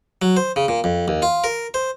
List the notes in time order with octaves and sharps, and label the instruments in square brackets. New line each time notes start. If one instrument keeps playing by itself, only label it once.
[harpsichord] F#3
C5
C#3
A#2
F2
D#2
F4
A#4
C5